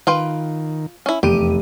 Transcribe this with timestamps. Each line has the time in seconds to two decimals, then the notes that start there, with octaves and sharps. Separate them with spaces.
0.07 D#3 F4 B4 G5
1.06 C#4 E4
1.23 F1 E2 G4 D#7